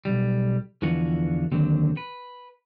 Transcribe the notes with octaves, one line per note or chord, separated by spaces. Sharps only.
B1 G3
E2 D3 E3 F3 F#4
D#2 D3 F#3 C4
B4